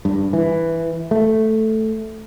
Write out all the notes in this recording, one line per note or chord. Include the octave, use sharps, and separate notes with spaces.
G2
E3
A3